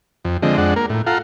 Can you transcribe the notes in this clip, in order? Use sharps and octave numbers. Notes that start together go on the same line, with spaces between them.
F2
D3 F3 G#3 C4 D#5
F2 G#3 D4 F#5
A#3 A#4
A2
F4 A4 F5 F#5 A#5